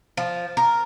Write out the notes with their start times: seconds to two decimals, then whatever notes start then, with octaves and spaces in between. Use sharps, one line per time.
0.17 F3
0.57 A#4